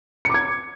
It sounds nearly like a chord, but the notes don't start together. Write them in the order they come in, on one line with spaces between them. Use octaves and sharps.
C#7 D6 G#6